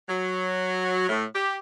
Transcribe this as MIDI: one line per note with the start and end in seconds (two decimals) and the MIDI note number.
0.09 1.07 54
1.09 1.25 45
1.35 1.57 67